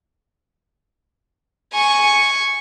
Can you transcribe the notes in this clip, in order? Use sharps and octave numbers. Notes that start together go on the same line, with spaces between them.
G#5 C#6